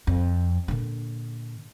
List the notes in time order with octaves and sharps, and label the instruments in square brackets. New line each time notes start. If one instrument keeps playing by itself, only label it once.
[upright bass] F2
A#2 D3